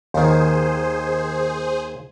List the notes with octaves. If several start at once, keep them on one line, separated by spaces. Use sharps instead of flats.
D#2 D#3 G#4 C5